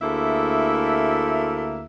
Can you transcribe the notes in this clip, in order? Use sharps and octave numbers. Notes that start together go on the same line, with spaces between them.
D2 A3 A#3 E4 G#4 E5